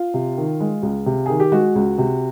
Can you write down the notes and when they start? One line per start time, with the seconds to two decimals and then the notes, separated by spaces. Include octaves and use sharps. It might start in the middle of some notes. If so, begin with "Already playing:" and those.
Already playing: F4
0.14 C3
0.38 D#3
0.60 G#3
0.83 C#2
1.06 C3
1.26 D#3 G#4
1.40 G4
1.52 G#3 F#4
1.76 C#2
1.98 C3